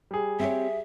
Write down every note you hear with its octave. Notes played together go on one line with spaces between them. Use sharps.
G3 G#4
C4 G4 C#5 E5